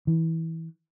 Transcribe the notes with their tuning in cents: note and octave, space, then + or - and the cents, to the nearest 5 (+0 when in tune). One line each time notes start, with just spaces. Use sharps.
E3 -20